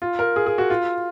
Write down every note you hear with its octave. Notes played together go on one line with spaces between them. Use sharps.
F4
A#4
G#4
G#4
F#4
F4